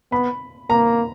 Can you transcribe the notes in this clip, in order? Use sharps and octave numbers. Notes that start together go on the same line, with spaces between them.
B3 B5
A#3 A#5